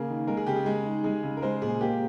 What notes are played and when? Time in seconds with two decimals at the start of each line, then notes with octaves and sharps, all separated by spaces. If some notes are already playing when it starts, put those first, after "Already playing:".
Already playing: C#3 A#3 G#4
0.09 D#3
0.27 G#3 A#4
0.37 G#4
0.46 C#3 G4
0.56 G#4
0.66 G#3
0.85 D#4
1.04 G#3 G#4
1.23 C#3
1.37 A#4
1.42 G#3 C5
1.62 A#2 G#4
1.81 A#3 G4